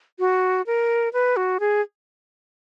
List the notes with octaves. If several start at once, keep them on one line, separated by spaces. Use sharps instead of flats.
F#4
A#4
B4
F#4
G#4